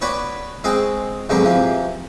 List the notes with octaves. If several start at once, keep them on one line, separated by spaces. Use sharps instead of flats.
B3 D4 F#4 B4 C#5
G#3 C4 F#4 G#4
C2 G#2 D3 F#3 B3 C#6
C3 E3 F3